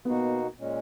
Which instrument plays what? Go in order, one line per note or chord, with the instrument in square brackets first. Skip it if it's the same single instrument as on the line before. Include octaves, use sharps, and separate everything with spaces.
[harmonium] B2 A#3 D#4 F#4 [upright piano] B3
[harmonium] A#2 G#3 C#4